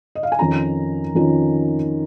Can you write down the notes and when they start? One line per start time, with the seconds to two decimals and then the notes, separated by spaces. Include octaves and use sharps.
0.15 D#5
0.23 F5
0.32 G#5
0.39 F2 D#3 C#4 F4 A#5
1.15 F2 D#3 C#4 F4